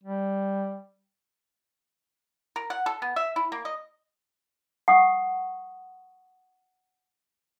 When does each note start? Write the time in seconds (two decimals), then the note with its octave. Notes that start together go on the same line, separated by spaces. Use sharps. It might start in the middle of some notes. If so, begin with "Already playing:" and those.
0.04 G3
2.56 A#4
2.70 F#5
2.86 A4
3.02 B3
3.16 E5
3.36 E4
3.52 A#3
3.65 D#5
4.88 F#5 C#6 D#6